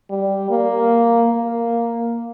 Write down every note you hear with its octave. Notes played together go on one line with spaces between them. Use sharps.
G3
A#3
A#3